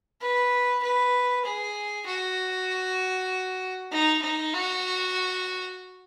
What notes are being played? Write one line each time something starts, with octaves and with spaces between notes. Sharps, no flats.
B4
B4
G#4
F#4
D#4
D#4
F#4